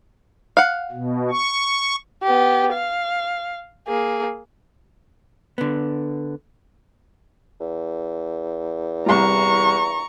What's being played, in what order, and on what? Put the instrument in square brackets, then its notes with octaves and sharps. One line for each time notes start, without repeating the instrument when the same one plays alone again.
[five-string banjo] F5 F#5
[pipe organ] B2
C#6
[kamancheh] B3 G4
F5
A#3 G#4
[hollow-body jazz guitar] D3 B3
[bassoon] E2
[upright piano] C2 G3 [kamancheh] A#5 C#6